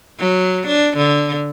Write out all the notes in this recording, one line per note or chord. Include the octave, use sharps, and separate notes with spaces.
F#3
D4
D3